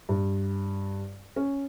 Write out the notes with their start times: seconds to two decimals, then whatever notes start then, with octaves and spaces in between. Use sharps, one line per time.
0.09 G2
1.36 C#4